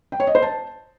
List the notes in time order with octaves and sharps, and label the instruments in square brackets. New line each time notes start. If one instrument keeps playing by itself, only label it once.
[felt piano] G5
C#5
D#5
C5
A5